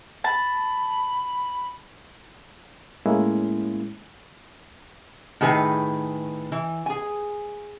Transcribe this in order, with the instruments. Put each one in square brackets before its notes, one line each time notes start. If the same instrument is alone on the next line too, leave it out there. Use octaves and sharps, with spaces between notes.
[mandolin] A5 [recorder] B5
[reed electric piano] A2 G#3 A#3 C#4 E4
[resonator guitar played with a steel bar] A2 D#3 G#4 B4 G#5
E3
G#4 G#5